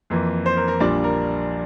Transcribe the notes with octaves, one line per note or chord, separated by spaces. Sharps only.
F2 E3 A#3
C5
A#4
A#4
A#1 A#2 G3 D4 D5
A#4